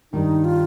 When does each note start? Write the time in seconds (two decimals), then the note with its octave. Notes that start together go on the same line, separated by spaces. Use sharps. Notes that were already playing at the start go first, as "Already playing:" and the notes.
0.12 G2 D#3 G3 D#4
0.44 F4